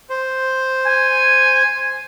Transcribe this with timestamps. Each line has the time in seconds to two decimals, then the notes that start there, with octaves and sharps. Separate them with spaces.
0.10 C5
0.86 G#5